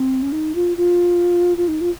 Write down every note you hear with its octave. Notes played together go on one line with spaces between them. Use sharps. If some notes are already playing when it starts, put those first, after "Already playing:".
Already playing: C4
C#4
D#4
F4
F4
F4
D#4
F4